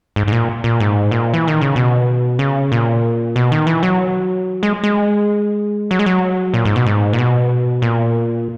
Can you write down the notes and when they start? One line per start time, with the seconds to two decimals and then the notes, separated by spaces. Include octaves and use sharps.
0.16 G#2
0.28 G#2
0.32 A#2
0.64 A#2
0.80 G#2
1.11 A#2
1.34 E3
1.48 D#3
1.61 C#3
1.76 B2
2.39 C#3
2.72 A#2
3.36 B2
3.52 D#3
3.67 E3
3.83 F#3
4.63 G#3
4.84 G#3
5.91 F#3
5.99 G#3
6.06 F#3
6.54 A#2
6.65 G#2
6.76 B2
6.86 G#2
7.13 A#2
7.18 B2
7.82 A#2